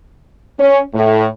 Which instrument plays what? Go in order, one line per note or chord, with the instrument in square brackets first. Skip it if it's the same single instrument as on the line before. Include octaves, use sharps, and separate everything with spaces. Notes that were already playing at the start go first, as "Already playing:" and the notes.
[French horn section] C#4
A2